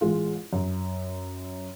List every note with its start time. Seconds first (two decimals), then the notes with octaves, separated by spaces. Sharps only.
0.01 A1 G#3 F4
0.53 F#2